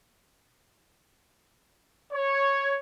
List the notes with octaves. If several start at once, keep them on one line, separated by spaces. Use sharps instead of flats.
C#5